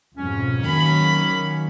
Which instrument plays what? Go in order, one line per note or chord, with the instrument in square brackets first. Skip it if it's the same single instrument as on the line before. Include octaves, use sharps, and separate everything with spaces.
[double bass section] F2 G#2 B2 [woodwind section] C#4
[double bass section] D#3 F#3 A#3 [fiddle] B5